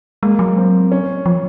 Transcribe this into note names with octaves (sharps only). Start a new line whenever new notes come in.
G#3 A#3
F#3
C4
C#4
F3